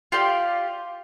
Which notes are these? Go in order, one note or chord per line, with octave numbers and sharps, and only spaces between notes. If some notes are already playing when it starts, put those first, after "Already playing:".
F4 G4 D5 F5